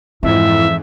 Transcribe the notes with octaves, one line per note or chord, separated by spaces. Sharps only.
F2 G#2 E3 E4 E5